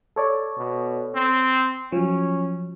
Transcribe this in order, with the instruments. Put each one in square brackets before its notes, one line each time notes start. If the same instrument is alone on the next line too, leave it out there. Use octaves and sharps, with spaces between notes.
[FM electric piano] A4 C#5 D5
[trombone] B2
C4
[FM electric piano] F3 F#3 [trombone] C#4